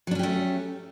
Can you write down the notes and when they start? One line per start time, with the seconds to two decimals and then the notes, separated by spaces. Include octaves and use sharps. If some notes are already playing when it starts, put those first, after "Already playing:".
0.07 F#3
0.11 D4
0.15 C#4
0.19 G4
0.23 A3